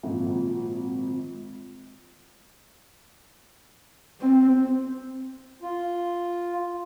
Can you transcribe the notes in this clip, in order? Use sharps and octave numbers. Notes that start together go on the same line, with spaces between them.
G#1 A#2 F3
C4
F4